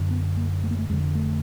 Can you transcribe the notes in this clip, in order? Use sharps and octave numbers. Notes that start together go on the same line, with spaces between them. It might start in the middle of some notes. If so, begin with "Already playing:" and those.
Already playing: F#2 D3
B3
A#3
A3
A#3
A3
F2 D3 G#3
A3